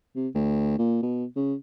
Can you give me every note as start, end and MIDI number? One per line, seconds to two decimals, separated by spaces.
0.16 0.28 48
0.35 0.74 38
0.78 0.99 46
1.02 1.25 47
1.36 1.54 49